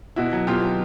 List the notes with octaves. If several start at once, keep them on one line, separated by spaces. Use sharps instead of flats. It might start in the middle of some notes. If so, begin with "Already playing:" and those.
B2 E4 F#4
F#3
B2 F4 G4
F#3